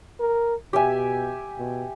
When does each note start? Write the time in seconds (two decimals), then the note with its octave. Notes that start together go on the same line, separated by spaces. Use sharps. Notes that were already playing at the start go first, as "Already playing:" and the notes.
0.20 A#4
0.73 B2 G4 E5 G#5
1.59 B2